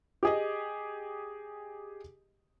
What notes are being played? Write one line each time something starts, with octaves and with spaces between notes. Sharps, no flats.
G4 G#4 D#5